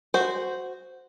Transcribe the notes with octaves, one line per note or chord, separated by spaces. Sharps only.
F#4 C5